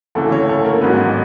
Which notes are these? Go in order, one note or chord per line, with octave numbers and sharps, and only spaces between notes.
D2 C#3 E3 A3 A4
C#4 C#5
A3 A4
A#3 A#4
A1 G#2 D#3 F#3 B3 B4